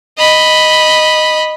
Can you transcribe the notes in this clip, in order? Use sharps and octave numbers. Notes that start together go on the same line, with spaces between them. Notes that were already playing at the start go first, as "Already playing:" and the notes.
D#5 B5